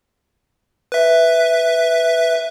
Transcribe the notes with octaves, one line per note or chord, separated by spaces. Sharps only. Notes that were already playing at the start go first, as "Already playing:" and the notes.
B4 E5